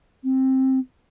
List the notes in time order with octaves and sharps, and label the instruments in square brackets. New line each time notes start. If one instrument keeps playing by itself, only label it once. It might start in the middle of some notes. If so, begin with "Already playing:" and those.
[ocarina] C4